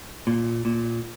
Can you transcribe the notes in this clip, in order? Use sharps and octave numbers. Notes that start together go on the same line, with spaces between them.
A#2
A#2